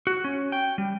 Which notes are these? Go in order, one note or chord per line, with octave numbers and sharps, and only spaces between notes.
F#4
C#4
G5
G3